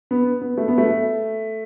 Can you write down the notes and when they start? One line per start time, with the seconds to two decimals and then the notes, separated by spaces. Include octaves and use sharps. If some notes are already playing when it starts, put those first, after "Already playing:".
0.11 B3
0.41 B3
0.58 A3
0.68 B3
0.78 A3